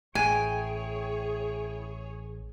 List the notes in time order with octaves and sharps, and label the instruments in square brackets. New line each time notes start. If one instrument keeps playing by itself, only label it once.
[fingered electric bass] A1 [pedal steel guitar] E4 G5 [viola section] G#4 C#5 [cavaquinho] G#5